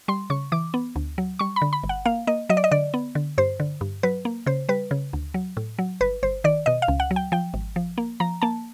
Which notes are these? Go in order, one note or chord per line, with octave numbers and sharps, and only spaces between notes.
G3 C6
C#3 C#6
E3 D6
B3
D2
F#3
G3 C#6
B5
D3
B5
G1
F#5
A#3 F5
A#3 D#5
F#3 D#5
D5
D#5
D3 D5
B3
D3
G2 C5
D3
G2
F#3 B4
A#3
C#3 C5
G3 B4
C#3
D2
F#3
A2
F#3
G1 B4
G1 C5
D#3 D5
B2 D#5
F5
C#2
F#5
F#3
G5
F3 G5
G#1
F3
A#3
F3 A#5
A#3 A5